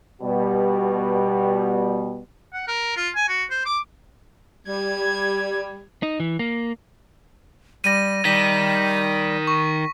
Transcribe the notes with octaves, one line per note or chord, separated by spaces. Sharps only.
B2 G3
F#5
A#4
F4
G#5
F#4
C5
D6
G3 G#6
D#4
E3
A#3
G3 A#6 D#7
D#3 G3 B6
C#6